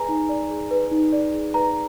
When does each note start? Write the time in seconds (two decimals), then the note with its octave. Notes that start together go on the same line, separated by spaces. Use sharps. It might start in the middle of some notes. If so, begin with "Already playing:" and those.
Already playing: G#4 B4 D5 G#5 A#5
0.09 D#4
0.29 D5
0.50 G#4
0.71 B4
0.92 D#4
1.13 D5
1.33 G#4
1.54 B4 A#5